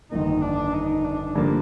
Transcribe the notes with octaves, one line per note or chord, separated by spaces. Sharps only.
G1 F2 D#3 A#3 D#4
D4
D#4
D4
G2 D3 F3 A#3